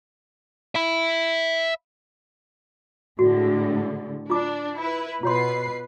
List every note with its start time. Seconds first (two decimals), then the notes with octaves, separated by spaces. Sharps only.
0.75 E5 B5
3.19 A2 D3 G#3 F#4
4.30 D4 F4 D6
4.78 E4 B4
5.23 B2 F4 B4 C#5 C6 C7